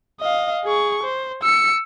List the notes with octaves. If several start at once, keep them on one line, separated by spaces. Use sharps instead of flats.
D#5 F5
G#4 C#6
C5
E6 C#7